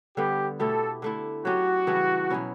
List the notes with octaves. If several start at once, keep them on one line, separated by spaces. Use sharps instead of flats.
D3 G3 B3 G4
B2 A3 E4 G4 A4
D3 A3 E4
F#3 C#4 F#4 G4
C#3 E3 G3 D4
B2 F#3 C#4 E4